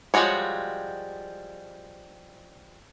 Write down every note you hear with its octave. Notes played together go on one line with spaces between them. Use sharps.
F3 G3 G#3 F#4 C#5